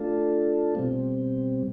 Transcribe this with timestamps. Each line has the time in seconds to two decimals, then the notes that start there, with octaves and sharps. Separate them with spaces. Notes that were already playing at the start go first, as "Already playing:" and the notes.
Already playing: A3 D4 F4 A4
0.75 B2 G3 C4